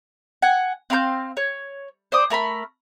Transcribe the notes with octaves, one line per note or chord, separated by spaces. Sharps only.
F#5 G#5
C4 F5 C6 G6
C#5
C5 D5 D#6
A3 A#4 A#5 B5